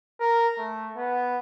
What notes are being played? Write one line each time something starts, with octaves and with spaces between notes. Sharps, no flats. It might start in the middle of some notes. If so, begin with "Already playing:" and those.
A#4
A3
B3